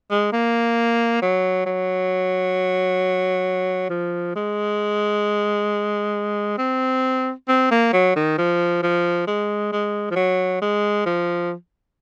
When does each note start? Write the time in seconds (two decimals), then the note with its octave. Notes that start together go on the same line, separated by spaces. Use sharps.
0.11 G#3
0.32 A#3
1.22 F#3
1.66 F#3
3.90 F3
4.36 G#3
6.58 C4
7.48 C4
7.71 A#3
7.93 F#3
8.16 D#3
8.38 F3
8.83 F3
9.27 G#3
9.72 G#3
10.11 F3
10.16 F#3
10.62 G#3
11.06 F3